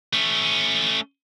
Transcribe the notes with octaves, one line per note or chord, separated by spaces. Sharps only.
A3 C#4